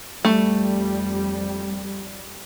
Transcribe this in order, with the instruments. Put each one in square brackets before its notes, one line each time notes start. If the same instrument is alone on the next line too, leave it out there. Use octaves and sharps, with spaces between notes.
[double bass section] F2 G3 [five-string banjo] A3